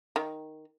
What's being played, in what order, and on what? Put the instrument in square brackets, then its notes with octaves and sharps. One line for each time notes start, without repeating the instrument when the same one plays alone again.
[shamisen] D#3